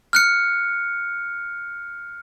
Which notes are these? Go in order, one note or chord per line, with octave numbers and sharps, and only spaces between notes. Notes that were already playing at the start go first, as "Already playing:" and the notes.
F6 F#6 C#7